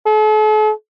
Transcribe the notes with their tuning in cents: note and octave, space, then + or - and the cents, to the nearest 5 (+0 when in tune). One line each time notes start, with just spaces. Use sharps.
A4 -45